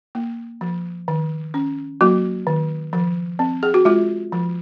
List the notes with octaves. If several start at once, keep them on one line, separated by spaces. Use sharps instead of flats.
A#3
F3
D#3
C#4
F#3 A#3 F#4
D#3
F3
C4
G#4
F#4
G#3 F4
F3